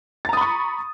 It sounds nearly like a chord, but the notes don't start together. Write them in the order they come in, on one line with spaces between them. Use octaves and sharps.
A6 A#5 D#6 B5 C#6